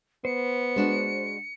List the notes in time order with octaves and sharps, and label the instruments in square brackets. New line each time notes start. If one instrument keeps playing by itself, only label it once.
[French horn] B3 [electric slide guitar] C5 [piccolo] C#7
[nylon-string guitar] G#3 D4 F#4